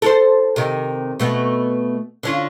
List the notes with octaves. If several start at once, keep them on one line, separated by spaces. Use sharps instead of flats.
A4 A#4 C5
C3 D#3
B2 A3 B3
D3 C#4 F4